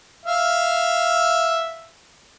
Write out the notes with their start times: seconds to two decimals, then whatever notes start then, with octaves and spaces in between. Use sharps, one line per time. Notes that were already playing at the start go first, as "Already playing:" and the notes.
0.25 E5 F5